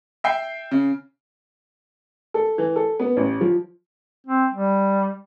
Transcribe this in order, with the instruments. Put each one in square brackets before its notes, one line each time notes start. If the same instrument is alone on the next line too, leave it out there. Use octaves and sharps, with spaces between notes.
[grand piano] E5 G5 C7
C#3
[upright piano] A4
E3
A4
B3
A1
F3
[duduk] C4
G3